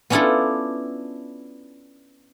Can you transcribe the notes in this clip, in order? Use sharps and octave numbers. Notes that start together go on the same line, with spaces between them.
B3 C#4 D4 E4 F4 A4